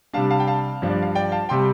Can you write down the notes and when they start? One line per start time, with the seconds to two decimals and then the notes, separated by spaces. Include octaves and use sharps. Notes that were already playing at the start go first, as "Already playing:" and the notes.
0.13 C3 G3 D4 F5 A5
0.30 F5 A5
0.40 G5
0.47 F5 A5
0.82 G2 F3 D4
0.90 D5
1.02 F5
1.15 D5 G5
1.32 F5 A5
1.49 C3 G3 G5 C6